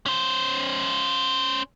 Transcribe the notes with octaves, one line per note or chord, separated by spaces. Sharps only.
C#4 C5